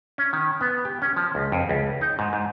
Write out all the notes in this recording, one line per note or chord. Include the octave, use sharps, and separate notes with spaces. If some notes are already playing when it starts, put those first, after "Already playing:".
C#4
D#3
B3
G4
C#4
F3
C#2
F2
C#2
D#4
G#2
G#2